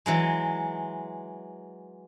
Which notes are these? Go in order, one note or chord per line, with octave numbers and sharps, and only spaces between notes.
E3 F#3 G#3